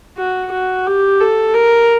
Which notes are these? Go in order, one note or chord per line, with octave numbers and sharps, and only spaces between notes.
F#4
F#4
G4
A4
A#4